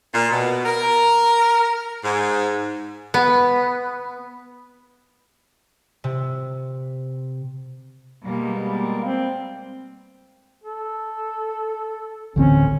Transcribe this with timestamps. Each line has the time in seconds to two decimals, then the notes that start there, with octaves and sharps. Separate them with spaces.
0.14 A#2
0.29 B2
0.65 A#4
2.02 G#2
3.14 B3
6.04 C3
8.24 B2 G3 G#3 A#3
8.68 A#3
9.04 C4
10.64 A4
12.36 D1 A1 D3 C4 C#4